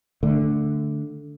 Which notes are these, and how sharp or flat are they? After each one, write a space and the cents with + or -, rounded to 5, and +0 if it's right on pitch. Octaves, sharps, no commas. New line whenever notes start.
D3 +0 A3 +0